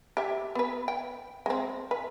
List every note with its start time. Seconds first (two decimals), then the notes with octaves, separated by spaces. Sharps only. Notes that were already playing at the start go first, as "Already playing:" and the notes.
0.17 G4 E5
0.55 B3 B4
0.88 G5
1.46 G#3 C4
1.91 B4